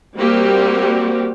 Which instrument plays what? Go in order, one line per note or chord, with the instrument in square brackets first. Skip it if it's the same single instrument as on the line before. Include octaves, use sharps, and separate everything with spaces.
[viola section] G3 A#3 C4 F#4 G4